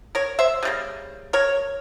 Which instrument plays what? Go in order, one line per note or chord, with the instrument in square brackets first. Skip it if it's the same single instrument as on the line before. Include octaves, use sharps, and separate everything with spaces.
[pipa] A#4 C#5
C5 E5
C#3 G3 A#3
A#4 C#5